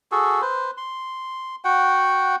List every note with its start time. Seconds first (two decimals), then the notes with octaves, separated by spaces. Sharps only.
0.12 F#4 G#4 A4
0.41 B4 C5
0.77 C6
1.65 F#4 F#5 G5